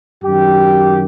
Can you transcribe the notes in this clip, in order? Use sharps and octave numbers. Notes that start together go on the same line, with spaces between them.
F#2 D#3 G4